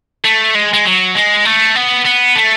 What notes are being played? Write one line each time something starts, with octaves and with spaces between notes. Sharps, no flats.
A3
G#3
G#3
F#3
G#3
A3
B3
B3
A3